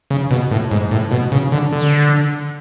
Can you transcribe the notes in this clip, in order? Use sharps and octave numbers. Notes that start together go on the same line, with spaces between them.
C#3
B2
A2
G#2
A2
B2
C#3
D3
D3